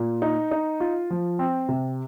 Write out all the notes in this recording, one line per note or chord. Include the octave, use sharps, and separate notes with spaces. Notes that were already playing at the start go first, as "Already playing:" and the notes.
Already playing: A#2
D#4
D#4
F4
F3
C4
C3